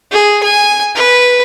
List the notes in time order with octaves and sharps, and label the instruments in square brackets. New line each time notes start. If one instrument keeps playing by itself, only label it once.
[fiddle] G#4
G#5
B4